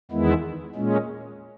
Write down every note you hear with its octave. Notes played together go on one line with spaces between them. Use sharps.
E2 D#3 G#3 B3 E4
A#2 G#3 C#4